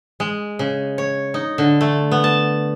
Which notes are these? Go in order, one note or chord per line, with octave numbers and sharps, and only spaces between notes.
G#3
C#3
C#5
D#4
D3
A3
B3
A5